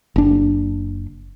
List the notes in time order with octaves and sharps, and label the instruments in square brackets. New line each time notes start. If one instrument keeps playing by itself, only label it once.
[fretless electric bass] F#1 D4